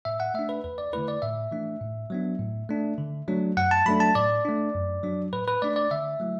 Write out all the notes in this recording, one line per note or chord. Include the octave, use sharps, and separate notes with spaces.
A2 E5
F#5
A3 D4 E5
B4
E2 B4
D5
D3 A3 E4 B4
D5
A2 E5
E3 A3 D4
A2
F#3 B3 D4
A2
A3 D4
D3
F#3 A3 D4
F#2 F#5
A5
F#3 A3 D4 B5
A5
A2 D5
A3 D4
F#2
F#3 D4
A2 B4
B4
A3 D4 D5
D5
D3 E5
F#3 A3 E4